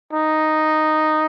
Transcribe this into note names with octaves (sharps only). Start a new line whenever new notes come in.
D#4